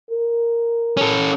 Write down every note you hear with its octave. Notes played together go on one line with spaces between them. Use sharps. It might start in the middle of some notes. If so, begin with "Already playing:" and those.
A#4
C#4 A4